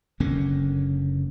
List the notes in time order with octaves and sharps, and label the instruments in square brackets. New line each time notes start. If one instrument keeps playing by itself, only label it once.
[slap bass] F#1 D3 A#3 C#4